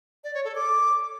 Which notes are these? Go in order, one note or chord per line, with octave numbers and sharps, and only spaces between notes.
D5
C#5
A4
D6